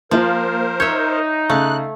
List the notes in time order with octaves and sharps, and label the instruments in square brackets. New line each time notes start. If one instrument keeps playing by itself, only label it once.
[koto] F3 [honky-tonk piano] A#3 F4 [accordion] A#4 C5
[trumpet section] D#4 [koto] C#5 E5 [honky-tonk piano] G6
[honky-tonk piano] C#3 [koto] A3 [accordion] F#6